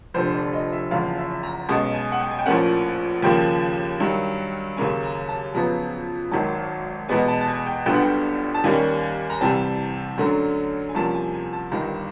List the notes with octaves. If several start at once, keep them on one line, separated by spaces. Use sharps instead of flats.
F1 F2 D3 C5
D5
D#5
E5
F#1 E2 C#3 F3 F5
E5
A#5
B1 B2 G#3 C#4 A5
G#5
F#5
G5
G#5
G5
A#1 A2 F3 A#3 C#4 F#5
D#2 C#3 F3 A#3 G5
G2 D#3 F#3
D#2 C#3 F#3 A#3 C#4 G#5
A#5
A5
F2 C#3 F#3 B3 A#5
G#1 F#2 D#3 F#3 A5
E2 B2 G#3 B3 G#5
A5
A5
G#5
G5
G1 F#2 D3 G3 B3 G5
F#5
G5
A5
D#2 D#3 G3 A#3 C#4 G#5
A#5
C2 C3 E3 G3 C4 A5
F#2 D3 F#3 A3 C#4 A#5
G#5
C2 C3 F3 A#3 C#4 A5
G#5
G#5
A5
G1 G2 D#3 A#5